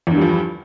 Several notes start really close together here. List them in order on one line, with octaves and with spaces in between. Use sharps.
E2 D3 G2 G3 F3